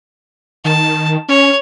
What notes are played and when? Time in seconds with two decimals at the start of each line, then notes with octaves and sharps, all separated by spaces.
0.65 D#3 A5
1.29 C#4 C#5